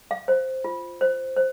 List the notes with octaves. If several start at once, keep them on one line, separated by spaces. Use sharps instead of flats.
F5
C5
F4
C5
C5